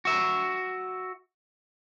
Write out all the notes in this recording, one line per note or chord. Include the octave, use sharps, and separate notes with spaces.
F#4 E5